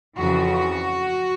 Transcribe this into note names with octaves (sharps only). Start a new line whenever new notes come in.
F2 C#3 E3 F#4